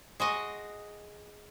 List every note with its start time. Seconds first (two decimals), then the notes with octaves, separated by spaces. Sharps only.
0.20 G#3 F#4 D#5